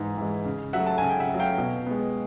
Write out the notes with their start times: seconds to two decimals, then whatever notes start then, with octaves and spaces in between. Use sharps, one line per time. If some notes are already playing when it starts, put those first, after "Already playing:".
Already playing: G#2 E3 G#3
0.18 E3 G#3
0.45 C#3
0.73 F#3 A3 E5 F#5
0.86 A5
0.98 C#3 G#5
1.10 G5
1.20 E5 F#5
1.29 F#3 A3
1.39 F5 G5
1.58 B2
1.87 G#3 B3